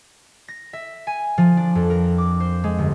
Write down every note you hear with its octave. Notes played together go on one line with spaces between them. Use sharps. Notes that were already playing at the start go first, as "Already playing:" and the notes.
A#6
E5
G#5
F3
D4
F2
A#4
D6
C5
G#3
G1